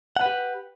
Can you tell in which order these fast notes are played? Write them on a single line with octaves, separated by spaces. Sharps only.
F#5 B4 G4